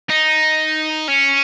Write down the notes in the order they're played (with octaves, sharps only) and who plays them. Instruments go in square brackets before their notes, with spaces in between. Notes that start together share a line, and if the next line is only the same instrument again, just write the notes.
[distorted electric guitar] D#4
C#4